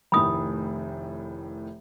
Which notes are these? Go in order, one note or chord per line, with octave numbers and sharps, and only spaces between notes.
F1 A2 D#3 B5 D#6